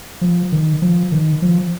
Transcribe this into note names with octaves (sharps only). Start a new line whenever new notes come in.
F3
D#3
F3
D#3
F3